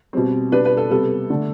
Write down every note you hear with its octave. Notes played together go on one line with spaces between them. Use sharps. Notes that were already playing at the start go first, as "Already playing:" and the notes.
B2 G3 C4
B2 G3 D4 B4
B4
A4
C3 G3 B3 A4
D3 A3 D4